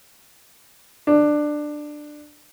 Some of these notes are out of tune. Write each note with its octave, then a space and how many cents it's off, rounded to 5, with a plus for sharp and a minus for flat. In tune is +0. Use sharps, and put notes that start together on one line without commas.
D4 +15